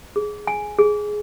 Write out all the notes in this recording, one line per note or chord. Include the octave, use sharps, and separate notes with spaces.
G#4
G#5
G#4